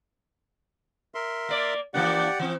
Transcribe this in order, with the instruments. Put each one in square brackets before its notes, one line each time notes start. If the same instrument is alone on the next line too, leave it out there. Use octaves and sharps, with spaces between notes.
[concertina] A#4 E5 C6
[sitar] A#3 D5
[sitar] E3 A#3 D4 [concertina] G4 D5 F#5
[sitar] E3 C4